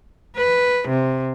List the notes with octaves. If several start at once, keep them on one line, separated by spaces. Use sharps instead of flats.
B4
C3